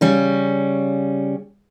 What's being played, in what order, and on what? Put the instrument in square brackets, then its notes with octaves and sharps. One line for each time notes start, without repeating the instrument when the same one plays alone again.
[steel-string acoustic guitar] C#3 G3 C#4